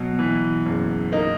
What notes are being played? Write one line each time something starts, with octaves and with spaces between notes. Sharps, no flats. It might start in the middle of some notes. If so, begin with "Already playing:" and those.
Already playing: B2 F#3
E3
F#1
A#3 D#4